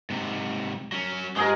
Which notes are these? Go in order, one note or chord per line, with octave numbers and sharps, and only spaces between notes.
G#2 C3
F#3 C#4
G#2 G#3 G#4 A#4